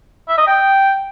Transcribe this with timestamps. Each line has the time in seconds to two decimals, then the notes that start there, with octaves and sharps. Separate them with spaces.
0.28 E5
0.38 D#5
0.47 G5